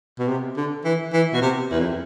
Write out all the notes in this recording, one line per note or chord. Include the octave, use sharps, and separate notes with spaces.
B2
C3
D3
E3
E3
B2
C3
E2
F2